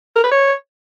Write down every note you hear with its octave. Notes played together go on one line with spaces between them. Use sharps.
A#4
B4
C#5